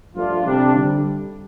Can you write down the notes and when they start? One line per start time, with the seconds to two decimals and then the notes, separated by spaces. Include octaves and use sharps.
0.16 G2 F3 A3 D4 F4
0.45 C3 G3 D4
0.75 D3 G3